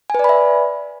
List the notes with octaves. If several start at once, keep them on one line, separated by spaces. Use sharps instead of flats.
B4 D5 E5 G#5 B5